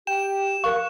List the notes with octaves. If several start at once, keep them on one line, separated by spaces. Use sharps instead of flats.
G4 G5 E7
A#4 F5 C#6 F#6